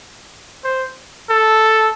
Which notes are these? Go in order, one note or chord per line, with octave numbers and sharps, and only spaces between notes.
C5
A4